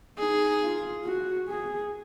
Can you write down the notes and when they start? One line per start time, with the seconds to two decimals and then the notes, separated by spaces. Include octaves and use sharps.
0.18 D#4 G#4
0.62 F4
1.05 F#4
1.48 G#4